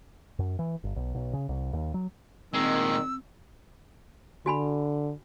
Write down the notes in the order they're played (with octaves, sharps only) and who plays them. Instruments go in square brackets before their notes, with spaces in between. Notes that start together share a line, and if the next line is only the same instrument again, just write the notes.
[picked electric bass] F#2
E3
G1
B1
B1
C#3
C2
D#2
F#3
[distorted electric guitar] A#2 G#3 [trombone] D#3 [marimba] C4 [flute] E6
[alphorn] D3 [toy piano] F#4 G#5 B5